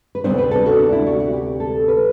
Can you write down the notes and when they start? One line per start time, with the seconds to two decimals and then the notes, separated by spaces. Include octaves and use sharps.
0.15 B4
0.24 D2 C3 G3 B3 D4 C5
0.38 B4
0.51 A4
0.66 F#4
0.79 D4
0.92 E4
1.07 F#4
1.20 F#4
1.33 G4
1.60 A4
1.88 B4